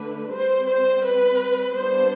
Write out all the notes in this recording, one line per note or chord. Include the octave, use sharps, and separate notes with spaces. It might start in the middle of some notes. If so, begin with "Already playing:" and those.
Already playing: D3 A3 D4 B4
G3 C4 C5
C5
B4
G3 B3 D4 C5